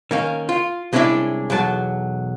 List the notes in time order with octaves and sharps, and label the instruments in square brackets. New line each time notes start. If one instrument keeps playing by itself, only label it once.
[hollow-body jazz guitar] D#3 A#3 C#4
F4
C2 G#3 C#4 D4 E4 D5
B1 E2 F#3 A5